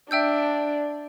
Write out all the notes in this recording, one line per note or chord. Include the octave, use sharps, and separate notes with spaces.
D4 E5 G5 E6 G6